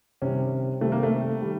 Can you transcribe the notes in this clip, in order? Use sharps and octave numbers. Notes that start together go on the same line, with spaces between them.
C3 D#3 G3 C#4
C3 D#3 G3 A3
A#3
A3
D#3 G3